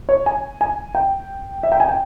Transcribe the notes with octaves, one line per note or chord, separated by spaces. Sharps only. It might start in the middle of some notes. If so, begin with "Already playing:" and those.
C#5
G#5
G#5
G5
E5
G5
G#5
G5